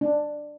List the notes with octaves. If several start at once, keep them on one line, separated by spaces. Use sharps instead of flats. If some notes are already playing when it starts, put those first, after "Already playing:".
D4